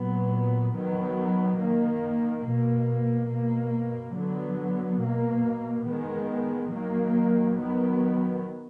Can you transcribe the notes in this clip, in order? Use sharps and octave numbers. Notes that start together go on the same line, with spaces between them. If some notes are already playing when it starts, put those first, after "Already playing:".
Already playing: A#2 F#3 B3
D#3 F#3 B3
D#3 A#3
B2 A#3
B2 A#3
D3 F#3 B3
B2 A#3
D#3 G#3 B3
D#3 F#3 A#3
D#3 F#3 B3